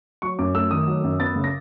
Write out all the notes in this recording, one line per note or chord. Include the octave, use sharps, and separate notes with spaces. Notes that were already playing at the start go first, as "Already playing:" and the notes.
F#3 C#6
F#2 D6
A3 E6
D#3 D#6
F#3
F#2
B3 A6
C#3
A#6